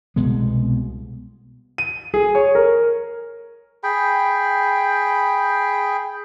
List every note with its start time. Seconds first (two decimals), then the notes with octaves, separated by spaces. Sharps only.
0.16 C2 B2 G#3 B3
1.78 D#7
2.14 G#4
2.35 C#5
2.55 A#4
3.84 G#4 G5 B5